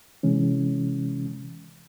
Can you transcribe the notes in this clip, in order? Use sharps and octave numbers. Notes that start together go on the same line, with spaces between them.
C3 E3 G#3 C#4